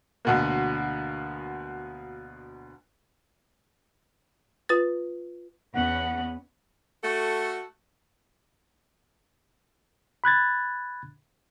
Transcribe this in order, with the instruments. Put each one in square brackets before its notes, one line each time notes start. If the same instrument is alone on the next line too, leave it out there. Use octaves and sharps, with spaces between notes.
[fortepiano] D2 B2 A#3
[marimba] F4 B4 A6
[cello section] E2 B3 C#4 [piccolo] F#5
[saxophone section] A3 F#4 A4
[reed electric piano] B5 F#6 G#6 A6